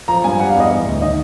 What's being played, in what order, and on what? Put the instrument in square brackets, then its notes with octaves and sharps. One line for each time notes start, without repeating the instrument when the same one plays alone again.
[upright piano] F3 A#5
G2 G#5
G3 F#5
F5
E2
D#5
E3
D2
D#3 D#5